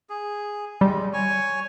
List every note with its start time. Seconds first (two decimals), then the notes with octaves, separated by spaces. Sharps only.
0.09 G#4
0.81 G3 G#3
1.13 C#5 G#5 C#6